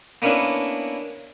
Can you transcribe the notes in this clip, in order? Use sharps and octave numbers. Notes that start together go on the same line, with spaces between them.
A#3 B3 C#4 D4 E4